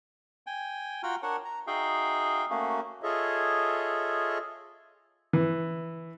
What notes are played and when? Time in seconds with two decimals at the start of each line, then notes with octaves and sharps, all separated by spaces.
0.47 G5 G#5
1.03 F4 F#4 F#5 G5 A#5 F6
1.23 D4 A#4 C#5 F#5
1.45 A#5
1.67 D#4 F#4 G#4 E5 F5 G5
2.50 A3 A#3 C#4 F#4
3.01 F4 G#4 A4 C#5 D#5 E5
5.33 E3